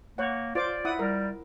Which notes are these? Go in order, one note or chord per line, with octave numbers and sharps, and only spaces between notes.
A#3 C#5 F#5
F4 C5 D5 D6
E4 F#5 D#6
G3 A#4